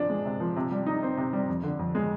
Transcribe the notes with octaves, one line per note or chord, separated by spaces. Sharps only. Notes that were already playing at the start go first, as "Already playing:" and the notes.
Already playing: C3 F3 D4
G#3
C3
F3
C3
G3
D#4
C4
C3
G3
F2
D3
F2
G#3